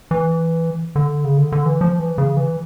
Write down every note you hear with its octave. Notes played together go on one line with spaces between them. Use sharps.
E3
D3
C#3
D3
D3
E3
F3
E3
C#3
E3